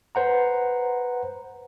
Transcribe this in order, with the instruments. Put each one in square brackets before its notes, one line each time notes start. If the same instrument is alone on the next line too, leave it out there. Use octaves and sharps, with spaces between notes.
[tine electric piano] B4 C5 F#5 A#5